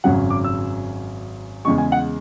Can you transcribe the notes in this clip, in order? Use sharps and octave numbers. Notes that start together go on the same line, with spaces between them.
G#1 F#2 C#3 F#3 F#5
D6
E6
E2 C#3 G#3 C#6
G#5
F#5